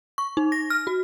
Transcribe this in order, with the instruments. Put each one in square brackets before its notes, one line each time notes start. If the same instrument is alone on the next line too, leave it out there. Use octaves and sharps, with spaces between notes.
[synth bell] C#6
D#4
A#6
F6
F#4